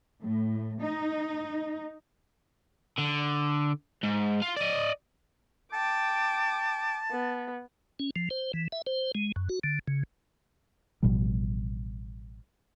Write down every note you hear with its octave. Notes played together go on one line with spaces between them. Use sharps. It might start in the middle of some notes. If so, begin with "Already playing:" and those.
A2
D#4
D3
G#2
F4
D5 D#5
G5 A5 D6
B3
C#4
F3
C5
E3
E5
C5
G#3
F#2
F#4
D3
C#3
A1 B2 F3 G3